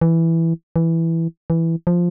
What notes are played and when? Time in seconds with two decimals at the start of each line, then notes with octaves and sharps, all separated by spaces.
0.01 E3
0.76 E3
1.50 E3
1.87 F3